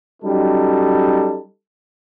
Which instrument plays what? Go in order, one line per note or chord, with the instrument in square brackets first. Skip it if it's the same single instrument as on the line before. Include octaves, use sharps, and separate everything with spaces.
[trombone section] F#3 G3 C#4 D#4 A4